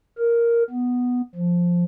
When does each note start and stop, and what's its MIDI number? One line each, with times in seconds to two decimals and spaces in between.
0.18 0.63 70
0.70 1.21 59
1.36 1.84 53